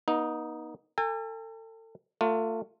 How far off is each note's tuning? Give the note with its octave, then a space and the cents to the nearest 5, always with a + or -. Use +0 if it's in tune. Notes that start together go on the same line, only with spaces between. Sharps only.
B3 -45 D#4 +0
A4 +35 G#5 -40
A3 +35 F4 +20